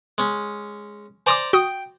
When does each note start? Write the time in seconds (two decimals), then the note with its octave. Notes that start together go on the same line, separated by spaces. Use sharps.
0.18 G#3 C#4
1.26 C5 D5 G#5 A#5 C6 D6
1.53 F#4 G5 D#6